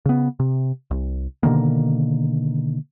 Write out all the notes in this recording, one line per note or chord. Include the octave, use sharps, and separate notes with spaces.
C#3 B3
C3
C2
B2 D3 D#3 A#3